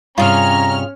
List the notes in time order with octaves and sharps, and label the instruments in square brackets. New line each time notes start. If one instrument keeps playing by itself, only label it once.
[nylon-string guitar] G2 C3 [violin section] C#4 F6 [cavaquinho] F4 G#4 [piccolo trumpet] A#5